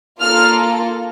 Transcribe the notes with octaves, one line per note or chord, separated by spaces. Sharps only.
A#3 F4 A4 F6